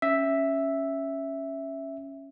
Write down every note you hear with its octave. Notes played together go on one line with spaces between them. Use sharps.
C#4 E5